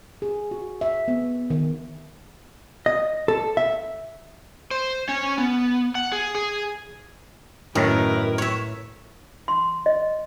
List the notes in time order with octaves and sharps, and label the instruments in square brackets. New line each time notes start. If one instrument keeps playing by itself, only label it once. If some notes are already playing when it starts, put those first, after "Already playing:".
[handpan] G#4
F#4
E5
B3
D#3
[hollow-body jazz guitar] D#5
A4
E5
[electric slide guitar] C5
C#4
B3
F#5
G#4
G#4
[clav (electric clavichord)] F#2 D#3 [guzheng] A2 [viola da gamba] E4 A#4 B4
[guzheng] C#5 E5
[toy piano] C6
D#5